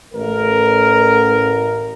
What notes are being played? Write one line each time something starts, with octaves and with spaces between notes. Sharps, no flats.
A1 A#4